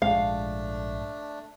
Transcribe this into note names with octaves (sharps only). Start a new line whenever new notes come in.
A#1 G#2 G#3 A3 D4 F5